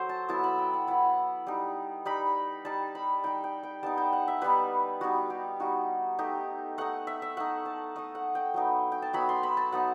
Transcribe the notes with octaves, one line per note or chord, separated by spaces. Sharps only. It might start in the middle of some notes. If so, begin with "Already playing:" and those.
Already playing: F#3 A4 C5
A5
F#3 B3 E4 A5
B5
G5
F#5
F#3 B3 E4 F#5
G3 D#4
G3 D#4 B5
G3 D#4 A5
B5
G3 D#4 G5
G5
G5
G3 B3 D#4 A5
G5
F#5
E5
G3 B3 D#4 B4
G3 B3 D#4 F#4
G4
G3 B3 D#4 F#4
A3 D#4 G4
A3 D#4 F#5
E5
E5
A3 D#4 F#5
A5
A3 D#4 D#5
F#5
G5
F#3 B3 D#4
G5
A5
F#3 B3 D#4 B5
C6
B5
A5
F#3 B3 D#4 F#5